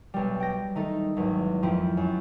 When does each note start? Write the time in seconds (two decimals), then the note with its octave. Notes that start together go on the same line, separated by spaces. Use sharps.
0.14 B1 G3
0.40 G5 A#6
0.75 D#3 A3 D#4 A4
1.16 G#1 E2 F#3
1.62 F2 F3 E4 G5
1.97 F#2